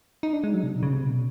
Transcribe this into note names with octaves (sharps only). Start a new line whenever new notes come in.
D#4
D4
G#3
F#3
C3
B2
C#3
C3
B2